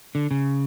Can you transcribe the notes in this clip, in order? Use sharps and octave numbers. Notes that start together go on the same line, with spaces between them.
D3
C#3